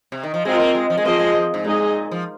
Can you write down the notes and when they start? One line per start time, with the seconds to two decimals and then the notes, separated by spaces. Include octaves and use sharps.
0.12 C3
0.23 D#3
0.34 F3
0.45 G#3 C4 F4 A#4
0.60 A#3
0.75 G#3
0.90 F3
0.97 G#3
1.05 F3 A#3 C4 G#4 C5 D#5
1.19 G#3
1.35 F3
1.54 G#2
1.64 A#2 G#3 D#4 G#4 D#5
2.11 F3